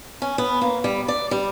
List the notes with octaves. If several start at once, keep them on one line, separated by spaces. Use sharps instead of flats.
C#4
B3
A#3
G3
D5
G3